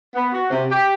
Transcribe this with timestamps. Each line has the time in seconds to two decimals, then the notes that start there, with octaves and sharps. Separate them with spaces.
0.14 B3
0.31 F#4
0.49 C3
0.70 G4